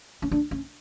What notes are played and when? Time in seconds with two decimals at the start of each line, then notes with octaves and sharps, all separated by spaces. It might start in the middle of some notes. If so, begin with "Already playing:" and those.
0.22 C#4
0.31 D4
0.51 C#4